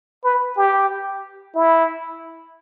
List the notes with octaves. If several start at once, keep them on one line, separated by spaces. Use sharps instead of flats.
B4
G4
E4